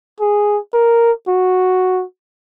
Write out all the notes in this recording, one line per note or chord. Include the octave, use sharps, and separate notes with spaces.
G#4
A#4
F#4